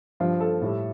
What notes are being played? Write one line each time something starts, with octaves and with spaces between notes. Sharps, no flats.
G2 F3 F4
A4
A2 G3